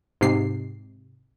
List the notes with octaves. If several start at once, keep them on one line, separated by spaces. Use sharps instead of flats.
G#2 C3 C7